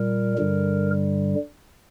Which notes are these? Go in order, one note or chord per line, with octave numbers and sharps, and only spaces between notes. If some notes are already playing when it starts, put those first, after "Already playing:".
Already playing: A#2 G3 A#4
G2 D3 G3